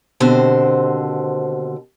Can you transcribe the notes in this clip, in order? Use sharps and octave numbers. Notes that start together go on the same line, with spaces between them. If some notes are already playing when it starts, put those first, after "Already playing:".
D#2 B2 D3 C4 C5